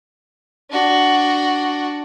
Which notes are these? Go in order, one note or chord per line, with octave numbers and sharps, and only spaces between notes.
D4 F#4